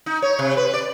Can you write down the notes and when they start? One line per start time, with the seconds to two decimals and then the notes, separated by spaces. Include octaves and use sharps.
0.06 D#4
0.22 C#5
0.39 C3
0.57 B4
0.74 D5